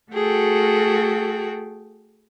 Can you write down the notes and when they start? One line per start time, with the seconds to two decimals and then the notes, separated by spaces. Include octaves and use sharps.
0.13 A3 F#4 G#4 A4 G5